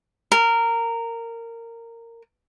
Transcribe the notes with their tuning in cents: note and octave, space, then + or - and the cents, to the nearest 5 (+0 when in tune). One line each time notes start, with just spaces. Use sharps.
A#4 -15